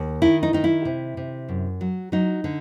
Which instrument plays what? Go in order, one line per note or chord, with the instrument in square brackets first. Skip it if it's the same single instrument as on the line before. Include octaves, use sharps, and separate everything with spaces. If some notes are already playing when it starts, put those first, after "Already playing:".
Already playing: [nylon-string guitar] D#2
D#3 E4
D#4
D#3 D#4
E4
C3
C3
F#2
F#3
F#3 D#4
D3